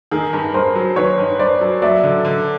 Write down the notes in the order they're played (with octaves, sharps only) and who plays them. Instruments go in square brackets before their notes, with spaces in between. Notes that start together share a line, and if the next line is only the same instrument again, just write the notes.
[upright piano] D#3 [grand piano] G#4 A#4
[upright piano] G2
[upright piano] G2 [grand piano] A#4 C5
[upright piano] F#3
[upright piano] D#3 [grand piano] B4 C#5
[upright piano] G2
[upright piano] G2 [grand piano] C5 D5
[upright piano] F#3
[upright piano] F#3 [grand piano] D5 E5
[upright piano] D3
D3